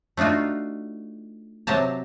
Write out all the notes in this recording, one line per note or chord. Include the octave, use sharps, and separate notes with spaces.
A3 D4 D#4 F4 F#4
C3 F#3 G4 A5 A#5